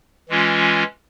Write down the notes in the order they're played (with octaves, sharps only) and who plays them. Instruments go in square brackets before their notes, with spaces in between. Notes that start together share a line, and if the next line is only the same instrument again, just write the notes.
[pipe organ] E3 G#3 C#4 F4